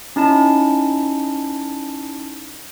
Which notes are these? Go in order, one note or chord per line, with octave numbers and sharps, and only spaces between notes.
C#4 D#4 E4 A5 B5